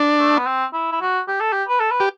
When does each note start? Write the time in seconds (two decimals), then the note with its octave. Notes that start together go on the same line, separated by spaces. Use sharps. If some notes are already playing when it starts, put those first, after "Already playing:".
Already playing: D4
0.19 A3
0.37 B3
0.46 C4
0.73 E4
0.92 E4
1.01 F#4
1.28 G4
1.40 A4
1.53 G4
1.68 B4
1.80 A4
1.91 B4
2.00 G4